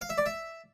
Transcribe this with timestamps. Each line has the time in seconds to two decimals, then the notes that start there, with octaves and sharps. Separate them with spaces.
0.01 F5
0.10 E5
0.18 D5
0.26 E5